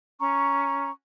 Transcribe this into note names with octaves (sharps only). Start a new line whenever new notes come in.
C#4 A#5 C#6